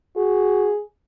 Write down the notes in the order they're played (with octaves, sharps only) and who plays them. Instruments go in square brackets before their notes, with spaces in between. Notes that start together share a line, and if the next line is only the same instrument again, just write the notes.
[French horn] F#4 [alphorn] G#4